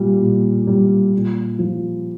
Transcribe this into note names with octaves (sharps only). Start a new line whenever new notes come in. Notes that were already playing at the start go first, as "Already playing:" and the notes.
Already playing: A#2 G3
A#2
G3
A#2
F3